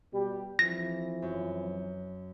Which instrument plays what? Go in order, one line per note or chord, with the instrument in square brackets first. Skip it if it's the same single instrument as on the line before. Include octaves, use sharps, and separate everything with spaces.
[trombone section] B2 G3 G4
[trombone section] F2 E3 F3 [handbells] A#6
[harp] F#2